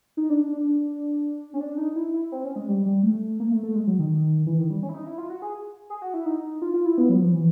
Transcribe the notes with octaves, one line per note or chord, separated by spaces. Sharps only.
D#4
D4
D4
C#4
D4
D#4
E4
E4
C4
C#4
G#3
G3
G3
A3
A#3
A3
A3
G#3
F#3
D#3
E3
D#3
G3
C#4
E4
D#4
E4
F4
F#4
G#4
G#4
F#4
E4
D#4
F4
F4
E4
B3
F#3
F3
E3